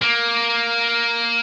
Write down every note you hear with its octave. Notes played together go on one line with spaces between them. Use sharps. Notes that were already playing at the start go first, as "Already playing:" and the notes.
A#3